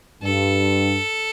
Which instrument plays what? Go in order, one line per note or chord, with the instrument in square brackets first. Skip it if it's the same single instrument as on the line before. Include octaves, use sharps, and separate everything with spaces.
[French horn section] G2 [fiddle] A4